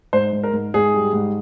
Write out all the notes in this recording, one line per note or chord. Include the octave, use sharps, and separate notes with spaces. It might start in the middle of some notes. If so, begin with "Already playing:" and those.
G#2 C5
G#2
A#4
G#2
G#2 G#4
G3
G#2